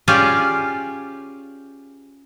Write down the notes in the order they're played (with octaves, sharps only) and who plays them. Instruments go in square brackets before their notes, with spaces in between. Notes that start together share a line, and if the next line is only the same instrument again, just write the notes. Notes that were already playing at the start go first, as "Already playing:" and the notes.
[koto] C#4 F4 G4 G#4 D5